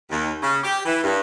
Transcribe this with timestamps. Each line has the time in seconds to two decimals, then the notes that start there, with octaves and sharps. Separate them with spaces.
0.10 D#2
0.43 C#3
0.64 G4
0.85 E3
1.04 G2